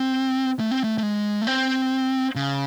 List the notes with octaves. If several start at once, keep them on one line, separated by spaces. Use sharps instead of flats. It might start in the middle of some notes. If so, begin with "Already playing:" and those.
Already playing: C4
A3
C4
A3
A3
G#3
A3
C4
C#3